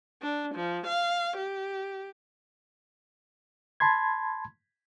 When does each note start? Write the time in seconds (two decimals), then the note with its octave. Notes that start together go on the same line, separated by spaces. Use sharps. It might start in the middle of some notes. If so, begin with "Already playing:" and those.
0.22 D4
0.55 F3
0.87 F5
1.37 G4
3.80 A5 B5 C6 G#6